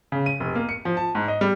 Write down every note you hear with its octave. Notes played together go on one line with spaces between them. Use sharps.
C#3
D#7
F1
A#3
C#7
F3
A5
G#2
D#5
G3